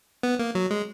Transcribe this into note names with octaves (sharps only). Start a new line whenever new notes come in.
B3
A#3
F#3
G#3